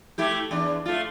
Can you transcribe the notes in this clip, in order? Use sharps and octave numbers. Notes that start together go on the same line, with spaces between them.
A3 E4 G4
E2 D4
A3 F4